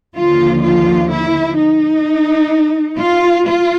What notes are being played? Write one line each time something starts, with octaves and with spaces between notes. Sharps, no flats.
D#2 D3 F3 F4
F4
E4
D#4
F4
F4